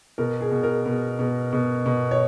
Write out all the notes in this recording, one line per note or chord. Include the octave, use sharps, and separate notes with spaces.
B2 A#4
G#4
B2
A#4
B2
B2
B2
B2
C#5